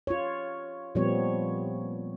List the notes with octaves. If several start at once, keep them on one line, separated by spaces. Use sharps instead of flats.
F4 C#5
A#2 F3 G3 B3 C4 C#5